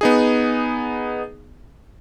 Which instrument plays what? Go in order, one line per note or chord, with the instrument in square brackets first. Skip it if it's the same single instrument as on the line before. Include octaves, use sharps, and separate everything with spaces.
[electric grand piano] B3 D#4 G#4